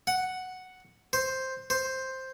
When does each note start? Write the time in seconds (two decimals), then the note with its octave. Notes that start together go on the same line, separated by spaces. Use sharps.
0.07 F#5
1.13 C5
1.70 C5